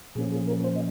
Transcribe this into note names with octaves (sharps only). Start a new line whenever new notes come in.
A#2 F3 A#3 C#4 G#4
G#4
A#4
C5
D#5